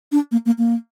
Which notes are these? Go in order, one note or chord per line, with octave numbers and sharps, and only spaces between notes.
D4
A#3
A#3
A#3